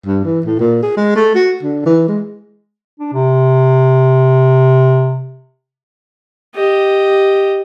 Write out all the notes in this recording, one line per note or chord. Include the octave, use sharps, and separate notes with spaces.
G2
E3
A2
A#2
G#4
G#3
A3
F#4
D3
E3
G#3
D4
C3
G4 D#5